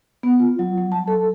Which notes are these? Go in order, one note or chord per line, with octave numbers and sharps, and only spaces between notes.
B3
F4
F#3
F#3
A5
A4